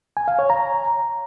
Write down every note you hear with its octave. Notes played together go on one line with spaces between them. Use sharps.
G#5
F5
C#5
A#5